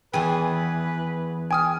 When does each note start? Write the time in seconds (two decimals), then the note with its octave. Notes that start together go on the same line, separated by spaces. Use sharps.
0.13 E2 G#4 B4 G5 G#5
1.51 G5 G#5 D#6 F6